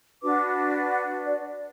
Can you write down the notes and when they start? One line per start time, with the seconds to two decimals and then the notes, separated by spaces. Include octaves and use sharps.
0.22 D4 F#4 B4 D6
0.91 F#5
1.26 D5